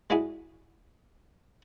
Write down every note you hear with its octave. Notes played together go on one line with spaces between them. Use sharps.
G#3 D4 E4 F#4 G#4